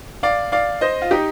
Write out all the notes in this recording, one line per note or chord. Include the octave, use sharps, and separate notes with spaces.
D5 F5
D5 F5
C5 D#5
F4
D#4 G4